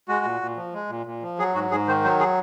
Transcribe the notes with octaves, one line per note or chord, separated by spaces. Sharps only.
G#3 F#4
A#2
A#2
F3
G#3
A#2
A#2
F3
F#3 G#4
G#2 F#4
G#2 G#4
D#3 C5
F#3 C5
G#4